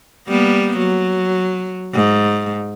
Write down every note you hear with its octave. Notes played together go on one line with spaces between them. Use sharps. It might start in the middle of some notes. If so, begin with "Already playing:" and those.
G3 A#3 B3
F#3
G#2